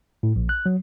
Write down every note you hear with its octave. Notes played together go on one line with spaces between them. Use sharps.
A2
A#1
F#6
F#3